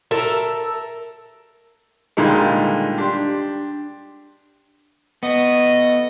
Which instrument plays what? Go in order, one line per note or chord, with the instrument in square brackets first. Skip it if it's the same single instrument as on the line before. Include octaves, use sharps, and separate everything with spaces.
[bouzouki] A4 A#4 E5
[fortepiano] A#2 D3 D#3 G3 G#3
D4 G4 C6
[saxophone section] F3 A3 D#5 [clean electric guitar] B3